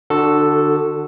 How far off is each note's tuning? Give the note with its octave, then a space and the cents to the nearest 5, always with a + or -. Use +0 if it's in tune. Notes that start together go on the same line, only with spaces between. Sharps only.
D3 +25 F#4 +0 A4 +0